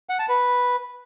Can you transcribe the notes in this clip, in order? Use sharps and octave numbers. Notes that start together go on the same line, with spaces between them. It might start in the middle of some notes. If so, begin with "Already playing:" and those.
F#5
A5
B4